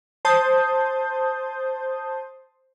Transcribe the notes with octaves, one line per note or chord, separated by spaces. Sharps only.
C5 A5 D#6 G6